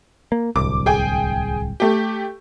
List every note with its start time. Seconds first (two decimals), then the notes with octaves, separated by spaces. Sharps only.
0.32 A#3
0.56 D1 C2 D6
0.86 G#4 G5 G#5
1.80 A3 G4